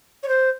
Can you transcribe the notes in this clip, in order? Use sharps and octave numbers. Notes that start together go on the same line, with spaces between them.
C#5
C5